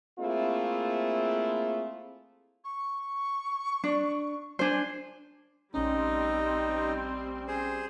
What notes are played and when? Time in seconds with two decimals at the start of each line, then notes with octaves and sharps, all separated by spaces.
0.19 A3 A#3 C4 E4 F4 G#4
2.64 C#6
3.84 D4
4.59 D4 C5 G#5
5.74 A#1 G3 A3 C4 C#4 D#4 C6
7.48 G#4 C5